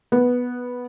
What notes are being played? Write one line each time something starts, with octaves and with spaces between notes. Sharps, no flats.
B3